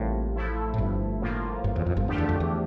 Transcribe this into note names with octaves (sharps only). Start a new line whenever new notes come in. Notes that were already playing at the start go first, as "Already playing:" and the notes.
Already playing: A1 A2 C3 G3 A#3 F4
F3 A3 E4 A4
A2
G1 G2
A2 F3 A#3 F4
G1 G2
E2
F2
G1 G2
F2 D3 F3 A3 D4 G4
E2
F2
E2